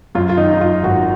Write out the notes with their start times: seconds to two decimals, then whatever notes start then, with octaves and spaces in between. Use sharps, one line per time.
0.15 F#2 F4
0.29 F4
0.37 D#3 D#4
0.54 D#4
0.60 F#2 F4
0.83 G#1 F#4